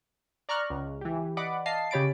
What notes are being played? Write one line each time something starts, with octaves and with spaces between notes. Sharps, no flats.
D5 A#5 C#6 F6 F#6
C#2
E3 G4
D5 D#5 F#5 B5 D6
D#5 F5 A5 C7
C#3 G4 C#5 B5 A6 D7